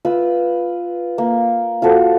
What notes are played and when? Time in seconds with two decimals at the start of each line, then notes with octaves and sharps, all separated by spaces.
0.05 F4 B4 E6
1.18 A#3
1.82 F4 F#4 A4 C5